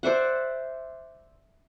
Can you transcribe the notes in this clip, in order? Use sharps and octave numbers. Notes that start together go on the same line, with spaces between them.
C5 D5 E5 F#5